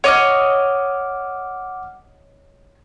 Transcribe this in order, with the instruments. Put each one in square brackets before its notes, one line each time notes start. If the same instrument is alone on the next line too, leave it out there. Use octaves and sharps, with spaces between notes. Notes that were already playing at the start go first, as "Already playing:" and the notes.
[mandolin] C#5 D#5 [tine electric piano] F#5 D6 F6